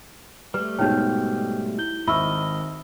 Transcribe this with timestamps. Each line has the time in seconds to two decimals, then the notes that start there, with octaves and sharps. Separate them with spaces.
0.54 G3 A3 B4
0.79 G#2 B2 G#3 D#4 C#5 G5 F6 G6
1.78 E4 G6 G7
2.08 G#1 D#5 E5 B5 C#6 E6 F6